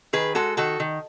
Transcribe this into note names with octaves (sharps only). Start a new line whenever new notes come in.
D#3 G#4 B4
G#3 F#4 A4
D#3 F#4 A4
D#3